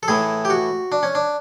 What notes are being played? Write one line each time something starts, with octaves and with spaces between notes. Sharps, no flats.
A4
A2 E3 G#4
G4
F#4
D4
C#4
D4